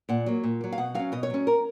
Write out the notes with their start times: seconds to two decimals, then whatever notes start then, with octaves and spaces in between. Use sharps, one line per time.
0.09 A#2 F#5
0.26 F#3 A#3
0.44 A#2
0.61 F#3 A#3
0.72 F5
0.78 B2 F#5
0.95 F#3 C#4 F5
1.12 B2 D#5
1.23 C#5
1.30 F#3 C#4
1.47 A#4